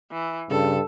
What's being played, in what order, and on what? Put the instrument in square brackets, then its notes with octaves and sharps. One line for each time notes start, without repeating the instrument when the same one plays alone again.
[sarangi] E3
[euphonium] G2 [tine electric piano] C#3 [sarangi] A4